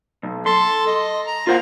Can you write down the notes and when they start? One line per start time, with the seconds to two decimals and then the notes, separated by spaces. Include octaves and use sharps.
0.23 B1
0.46 A4 C6
0.87 D#5
1.26 A#5
1.47 A#3 F4 C5 F#5